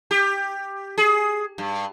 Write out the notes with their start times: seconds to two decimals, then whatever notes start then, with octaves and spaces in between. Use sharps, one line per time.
0.11 G4
0.98 G#4
1.58 G2